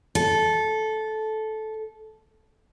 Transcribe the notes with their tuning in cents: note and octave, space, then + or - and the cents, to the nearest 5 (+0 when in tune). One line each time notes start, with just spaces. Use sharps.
A4 -15